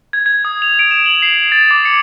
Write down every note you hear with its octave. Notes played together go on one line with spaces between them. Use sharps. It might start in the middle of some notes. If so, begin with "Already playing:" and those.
G#6
G#6
D#6
F7
D7
E7
F#7
C7
A6
D6
C#7